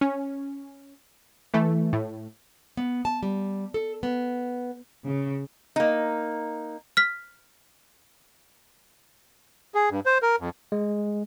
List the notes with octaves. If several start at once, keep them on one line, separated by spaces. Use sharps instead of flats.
C#4
E3 A3
A2
B3
A5
G3
A4
B3
C#3
A#3 D#4
F6 B6
G#4
G2
C5
A#4
F2
G#3